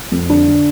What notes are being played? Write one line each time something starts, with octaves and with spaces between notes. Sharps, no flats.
F2
D3 D4
D3